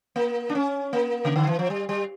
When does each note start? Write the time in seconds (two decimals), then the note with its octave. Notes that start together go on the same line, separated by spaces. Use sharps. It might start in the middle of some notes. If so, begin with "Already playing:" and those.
0.16 A#3
0.49 D4
0.55 C#4
0.93 A#3
1.25 C#3
1.36 D3
1.47 E3
1.59 F3
1.70 G3
1.89 G3